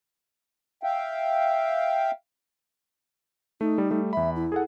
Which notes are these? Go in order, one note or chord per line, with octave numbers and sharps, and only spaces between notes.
E5 F5 G5
A3 D#4
G3
G3 A3
E2 E5 B5
E4
G#4 A4 F#5